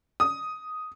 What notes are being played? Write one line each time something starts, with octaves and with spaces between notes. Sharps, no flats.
D#6